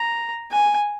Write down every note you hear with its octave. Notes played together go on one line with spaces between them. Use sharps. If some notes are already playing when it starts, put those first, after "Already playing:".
Already playing: A#5
G#5